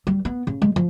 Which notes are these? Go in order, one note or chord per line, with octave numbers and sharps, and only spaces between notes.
G3
B3
C#3
G#3
F3